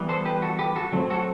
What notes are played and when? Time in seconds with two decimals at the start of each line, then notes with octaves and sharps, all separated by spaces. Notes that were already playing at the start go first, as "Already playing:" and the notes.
Already playing: E3 G3 B3
0.09 A4 C5
0.25 G4 B4
0.42 F#4 A4
0.59 G4 B4
0.76 F#4 A4
0.92 F#3 A3 C4
1.10 F#4 A4